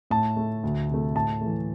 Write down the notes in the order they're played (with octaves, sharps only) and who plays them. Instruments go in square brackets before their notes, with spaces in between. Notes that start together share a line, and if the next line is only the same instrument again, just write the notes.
[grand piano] A2 A5
A3
D2
C3 A3
A2 A5
A3
E3